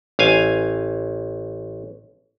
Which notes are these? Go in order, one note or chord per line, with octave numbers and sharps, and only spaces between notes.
A1 F5 G#5